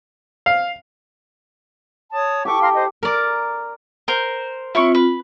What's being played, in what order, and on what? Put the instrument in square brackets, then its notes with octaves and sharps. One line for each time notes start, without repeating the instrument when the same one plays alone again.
[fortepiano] F5
[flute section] C#5 A5 D#6
[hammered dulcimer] G4 A4 G5 [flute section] C#6 D6
[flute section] F5 A#5 C6
C5 D#5
[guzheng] A#4 D5
[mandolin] A#4 C5
[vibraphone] C4 F4 [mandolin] E4 C#5 C#6
[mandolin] B4